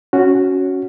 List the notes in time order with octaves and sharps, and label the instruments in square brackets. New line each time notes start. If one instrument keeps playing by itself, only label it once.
[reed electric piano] C#4 F#4